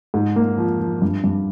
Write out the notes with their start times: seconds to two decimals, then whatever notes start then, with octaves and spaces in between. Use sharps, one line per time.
0.14 G#2
0.36 A#3
0.58 F3
0.80 F3
1.02 G2
1.24 G2